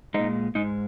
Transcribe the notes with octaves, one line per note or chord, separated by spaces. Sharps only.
A#2 G#3 D#4
G#2 G#3 D#4